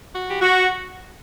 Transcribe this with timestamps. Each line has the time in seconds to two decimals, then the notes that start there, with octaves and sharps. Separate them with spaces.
0.14 F#4
0.28 E3 G4
0.41 F#4